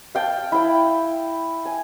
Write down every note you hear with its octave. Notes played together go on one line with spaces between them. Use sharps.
F5 G5 A5
E4 G5
G#5